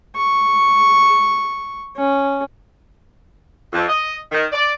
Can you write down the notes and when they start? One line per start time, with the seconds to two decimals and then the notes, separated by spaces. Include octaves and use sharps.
0.16 C#6
1.96 C#4
3.73 F2
3.88 D#5
4.32 D#3
4.52 D5